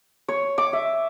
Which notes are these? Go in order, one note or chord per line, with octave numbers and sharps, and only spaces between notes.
C#5
D6
E5